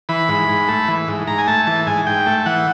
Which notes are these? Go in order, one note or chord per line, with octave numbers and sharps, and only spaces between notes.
E3 B5
G#2
G#2
A3
E3
G#2
G#2 A#5
G#5
A3 A5
E3 A5
G#2 G#5
G#2 G5
A3
E3 F#5